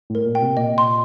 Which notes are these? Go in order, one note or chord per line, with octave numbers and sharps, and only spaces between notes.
A2 A#4
A#2
G5
C3
A#2 D#5
C6